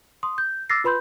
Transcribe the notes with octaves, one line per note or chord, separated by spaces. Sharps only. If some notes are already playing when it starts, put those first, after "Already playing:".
C6 D#6
G6
D6 E6 F6 A6 A#6 C7
F4 B4 B5 C6 G6